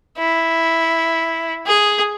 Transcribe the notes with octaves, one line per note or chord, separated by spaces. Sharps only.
E4
G#4